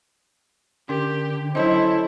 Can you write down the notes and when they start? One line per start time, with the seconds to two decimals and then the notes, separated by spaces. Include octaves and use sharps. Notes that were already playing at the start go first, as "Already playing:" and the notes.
0.89 D3 C#4 G4 A#4
1.55 F#3 C#4 E4 A4 C5 C#5 D#5